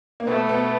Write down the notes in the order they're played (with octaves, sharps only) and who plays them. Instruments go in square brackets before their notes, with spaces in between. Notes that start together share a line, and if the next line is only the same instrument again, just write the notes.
[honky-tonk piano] A#3
[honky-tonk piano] B2 B3 [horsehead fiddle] A3
[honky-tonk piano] B2 B3